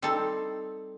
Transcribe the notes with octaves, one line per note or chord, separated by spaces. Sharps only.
G3 C4 D#4 A4